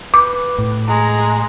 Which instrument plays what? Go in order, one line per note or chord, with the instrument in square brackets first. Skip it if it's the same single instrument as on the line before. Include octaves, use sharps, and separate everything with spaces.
[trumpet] B4 [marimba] D6
[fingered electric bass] A2
[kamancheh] G#3 [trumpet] A#5